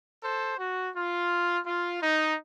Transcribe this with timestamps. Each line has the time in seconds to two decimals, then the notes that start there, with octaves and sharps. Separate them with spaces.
0.22 A4 C5
0.58 F#4
0.93 F4
1.65 F4
2.01 D#4